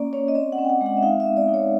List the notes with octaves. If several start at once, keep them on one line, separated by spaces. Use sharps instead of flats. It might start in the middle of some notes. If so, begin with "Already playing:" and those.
Already playing: A#3 C#4 D5
C#4 C#5
D#5
C4 D5
F#5
C4
G5
F#5
G#3
F#5
E5
D#4 F5
E5
B3
D5
D#4
C#5